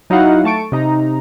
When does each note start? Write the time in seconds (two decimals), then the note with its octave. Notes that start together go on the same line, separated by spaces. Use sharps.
0.10 F#3 D#4 E4 F#4 F5 F#5
0.44 A3 A5 C#6 D7
0.72 C3 D#4 A#5